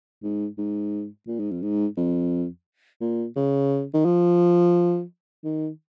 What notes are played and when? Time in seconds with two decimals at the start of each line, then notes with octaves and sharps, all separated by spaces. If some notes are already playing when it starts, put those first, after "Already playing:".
0.23 G#2
0.58 G#2
1.27 A#2
1.40 G#2
1.51 F2
1.62 G#2
1.97 F2
3.01 A#2
3.36 C#3
3.94 D#3
4.05 F3
5.44 D#3